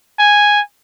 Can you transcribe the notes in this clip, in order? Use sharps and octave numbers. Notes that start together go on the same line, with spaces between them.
G#5